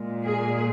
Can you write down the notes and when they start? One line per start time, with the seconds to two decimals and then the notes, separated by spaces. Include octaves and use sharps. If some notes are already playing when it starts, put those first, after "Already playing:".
Already playing: A#2 G#3
0.24 G#4